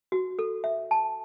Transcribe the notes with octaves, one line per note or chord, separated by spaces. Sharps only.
F#4
A4
E5
A5